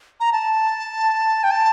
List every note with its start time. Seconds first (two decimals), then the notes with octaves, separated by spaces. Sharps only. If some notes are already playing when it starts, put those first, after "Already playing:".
0.20 A#5
0.33 A5
1.44 G5
1.51 A5